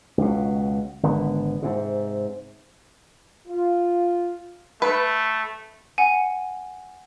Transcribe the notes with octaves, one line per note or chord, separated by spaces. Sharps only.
C#2 B2
G#1 D3 B3
G#2 C3
F4
A3 B4
F#5 G#5